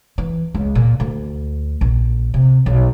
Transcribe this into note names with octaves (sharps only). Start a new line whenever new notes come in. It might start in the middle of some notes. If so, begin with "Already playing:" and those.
E3
C#2
A#2
D2
A#1
C3
B1